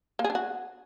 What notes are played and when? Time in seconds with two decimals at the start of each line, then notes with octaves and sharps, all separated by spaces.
0.19 A#3
0.24 G#4
0.30 D4
0.35 F#4